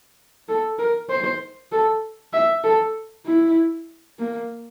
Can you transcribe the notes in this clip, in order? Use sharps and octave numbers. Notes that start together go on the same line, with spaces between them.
A4
A#4
C5
A4
E5
A4
E4
A#3